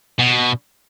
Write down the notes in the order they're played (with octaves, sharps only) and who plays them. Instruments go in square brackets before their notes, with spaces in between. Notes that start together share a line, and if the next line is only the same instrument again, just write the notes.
[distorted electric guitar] B2